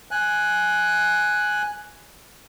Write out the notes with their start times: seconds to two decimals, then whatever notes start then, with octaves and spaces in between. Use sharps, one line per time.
0.11 G#5 F#6